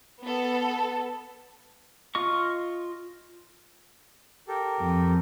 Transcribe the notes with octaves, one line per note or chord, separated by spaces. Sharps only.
B3 A4
F4 D#5 C#6
G4 A4 A#4
F2